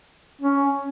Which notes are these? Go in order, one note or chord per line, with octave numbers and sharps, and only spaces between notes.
C#4